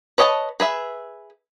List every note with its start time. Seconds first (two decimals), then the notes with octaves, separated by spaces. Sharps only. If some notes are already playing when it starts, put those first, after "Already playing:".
0.18 B4 C#5 D#5 G#5 A5
0.60 G#4 B4 E5